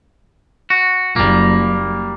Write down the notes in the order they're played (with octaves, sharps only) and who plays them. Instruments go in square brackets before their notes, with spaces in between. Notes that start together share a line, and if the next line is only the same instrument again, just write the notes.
[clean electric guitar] F#4
[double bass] F#1 [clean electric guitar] G3 A#3